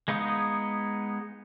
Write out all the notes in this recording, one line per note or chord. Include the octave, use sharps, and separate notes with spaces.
G#3 B3 D#4 F5 D#6